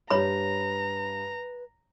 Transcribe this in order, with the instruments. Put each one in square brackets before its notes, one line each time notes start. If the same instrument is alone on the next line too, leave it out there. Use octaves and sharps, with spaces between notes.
[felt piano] G2 G3 [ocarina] B4 [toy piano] C#5 B5 [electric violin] A#5